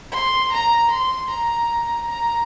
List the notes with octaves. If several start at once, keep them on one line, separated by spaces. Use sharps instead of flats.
C6
A#5
C6
A#5
A#5